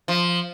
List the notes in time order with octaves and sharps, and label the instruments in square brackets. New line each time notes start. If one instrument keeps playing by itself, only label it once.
[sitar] F3